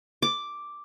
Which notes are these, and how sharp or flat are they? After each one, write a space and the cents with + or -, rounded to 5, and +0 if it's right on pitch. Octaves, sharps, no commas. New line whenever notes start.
D6 +0